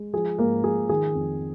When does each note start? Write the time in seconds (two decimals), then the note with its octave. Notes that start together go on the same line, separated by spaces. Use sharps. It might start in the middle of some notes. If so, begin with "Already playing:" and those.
Already playing: G#3
0.13 F3 G#4
0.38 G#2 A#3 A#4
0.64 F3 G#4
0.89 D#3 G#4
1.15 F2